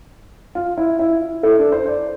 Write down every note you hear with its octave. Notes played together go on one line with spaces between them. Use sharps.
F4
E4
E4
E4 A4
D4
C5
D5